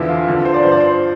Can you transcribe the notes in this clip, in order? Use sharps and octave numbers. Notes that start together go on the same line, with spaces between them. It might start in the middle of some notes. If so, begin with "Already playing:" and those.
Already playing: E2 D3 F3 E4
F4
D2 D3 F3
C5
D5
G2 F3 C5
D5
C5